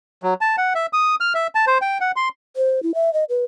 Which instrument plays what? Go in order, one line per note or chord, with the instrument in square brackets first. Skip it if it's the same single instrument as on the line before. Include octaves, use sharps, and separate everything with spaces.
[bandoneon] F#3
A5
F#5
E5
D#6
F6
E5
A5
C5
G5
F#5
C6
[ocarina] C5
E4
E5
D#5
B4